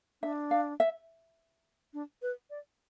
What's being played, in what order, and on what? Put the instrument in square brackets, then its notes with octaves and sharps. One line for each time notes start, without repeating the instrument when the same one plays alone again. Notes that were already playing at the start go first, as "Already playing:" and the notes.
[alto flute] D4 [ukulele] E5
[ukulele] F5
E5
[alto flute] D4
B4
D5